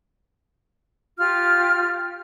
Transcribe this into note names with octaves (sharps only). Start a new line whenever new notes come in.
F4 G4 F6